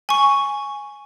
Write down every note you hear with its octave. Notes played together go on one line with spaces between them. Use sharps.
G#5 C#6